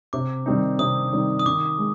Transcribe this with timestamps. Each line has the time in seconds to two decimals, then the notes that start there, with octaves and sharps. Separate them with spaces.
0.13 C3 D6
0.46 D#3 G3 C4 D#4
0.79 C3 D#6
1.13 D#3 G3 C4 D#4
1.39 D#6
1.46 D#3 D6
1.79 G#3